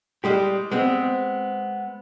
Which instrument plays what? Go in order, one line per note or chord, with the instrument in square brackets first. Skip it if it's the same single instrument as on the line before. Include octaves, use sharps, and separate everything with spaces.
[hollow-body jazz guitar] G3 G#3 G4
G#3 B3 C4